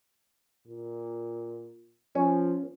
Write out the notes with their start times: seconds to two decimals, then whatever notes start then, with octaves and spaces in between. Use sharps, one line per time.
0.67 A#2
2.15 F3 C#4